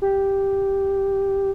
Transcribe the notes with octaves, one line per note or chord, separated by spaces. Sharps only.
G4